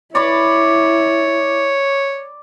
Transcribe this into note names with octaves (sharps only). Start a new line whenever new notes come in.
E4 C#5 D5 B5 C#6